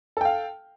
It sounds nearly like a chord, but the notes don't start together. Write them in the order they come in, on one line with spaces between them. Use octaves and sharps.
A4 G5 F5